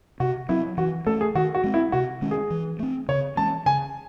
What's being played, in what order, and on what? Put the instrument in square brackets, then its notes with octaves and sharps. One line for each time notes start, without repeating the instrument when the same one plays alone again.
[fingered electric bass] C3 [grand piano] F#4
[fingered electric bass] F#3 C4 [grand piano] E4
[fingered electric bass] E3 [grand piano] F#4
[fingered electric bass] A3 C#4 [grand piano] A4
[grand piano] G#4
[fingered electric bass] D#3 [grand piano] F#4
[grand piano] F#4
[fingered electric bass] G#3 C4
[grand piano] E4
[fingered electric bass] C3 [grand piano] F#4
[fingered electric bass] D#3 G#3 C#4
[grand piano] G#4
[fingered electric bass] E3
A3 C4
[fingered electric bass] C#3 [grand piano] C#5
[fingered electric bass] E3 G#3 C#4 [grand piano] A5
[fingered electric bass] C#3 [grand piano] G#5